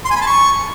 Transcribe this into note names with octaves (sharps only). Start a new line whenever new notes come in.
C6
G#5
B5
A5
C#6